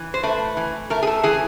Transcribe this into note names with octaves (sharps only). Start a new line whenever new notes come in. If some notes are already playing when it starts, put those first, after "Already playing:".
Already playing: E3
C5
A3 B4
E3
A3 A#4
G#4
A4
E3 G#4